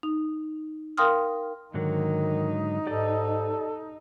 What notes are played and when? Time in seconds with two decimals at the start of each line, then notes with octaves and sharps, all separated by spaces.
0.03 D#4
0.98 A#4 F5 G5 C6 D#6 F6
1.74 G#2 D3 D#3 F#3 D#4
2.87 G#2 G4 A4 D5 D#5